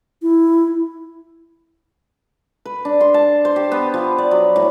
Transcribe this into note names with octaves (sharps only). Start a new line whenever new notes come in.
E4
B4
D4
C6
A5
C5
G4
B3
F3
D5
F#3
A2